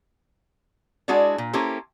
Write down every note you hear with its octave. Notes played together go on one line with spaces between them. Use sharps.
G#3 D4 E4 F#4 G#4 D5
A#2
A#3 C#4 E4 G4 A4 C5